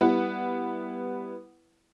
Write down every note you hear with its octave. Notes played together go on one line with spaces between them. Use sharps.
G3 B3 E4 B4 F#5